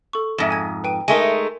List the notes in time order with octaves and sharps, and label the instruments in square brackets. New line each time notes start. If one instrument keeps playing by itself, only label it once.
[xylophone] A4 C#6
[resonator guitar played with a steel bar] F2 G#2 [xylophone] E5 A#6 E7
[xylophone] G#5 G#6 A#6
B4 G5 D#7
[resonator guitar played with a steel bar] G#3 A3 D#4 [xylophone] A#4 G#5